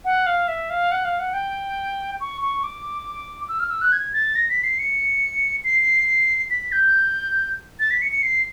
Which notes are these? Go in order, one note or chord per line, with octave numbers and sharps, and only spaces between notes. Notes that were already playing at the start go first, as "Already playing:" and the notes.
F#5
F5
E5
F5
F#5
F5
F#5
G5
C#6
C#6
D6
E6
F6
E6
F#6
G#6
A6
A#6
B6
C7
C#7
C7
B6
G6
A6
B6
C#7
C#7
C7